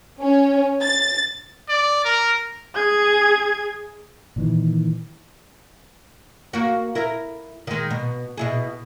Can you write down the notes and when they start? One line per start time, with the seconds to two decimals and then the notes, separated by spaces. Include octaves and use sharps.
0.20 C#4
0.82 A6
1.69 D5
2.05 A#4
2.75 G#4 G#6
4.36 A#2 D#3 E3
6.53 A#3 F#4
6.95 E4 A#4
7.67 D#3 G#3
7.90 B2
8.37 B2 E4 G#4